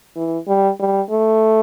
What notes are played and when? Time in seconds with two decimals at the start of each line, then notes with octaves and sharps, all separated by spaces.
0.16 E3
0.48 G3
0.79 G3
1.11 A3